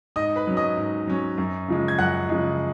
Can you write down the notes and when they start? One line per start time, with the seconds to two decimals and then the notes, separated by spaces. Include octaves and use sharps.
0.16 G#2 D#5 D#6
0.36 B4 B5
0.47 F#3 C#4
0.57 D#5 D#6
0.77 G#2
1.07 F#3 C#4
1.38 F#2
1.68 C#3 F3 G#3
1.88 G#6
1.98 F#2 F#5 F#6
2.29 C#3 F3 G#3